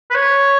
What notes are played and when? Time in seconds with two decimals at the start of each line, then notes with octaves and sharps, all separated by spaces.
0.11 B4
0.14 C#5